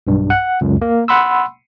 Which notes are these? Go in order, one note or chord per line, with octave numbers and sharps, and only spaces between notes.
B1 G2
F#5
C#2 F#2
A#3
F#5 B5 C6 E6